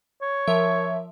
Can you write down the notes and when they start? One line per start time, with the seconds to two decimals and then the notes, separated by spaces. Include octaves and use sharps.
0.22 C#5
0.48 F3 A#4 E5